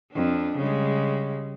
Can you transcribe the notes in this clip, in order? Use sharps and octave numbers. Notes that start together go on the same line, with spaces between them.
F2 D4
C#3 G3 G#3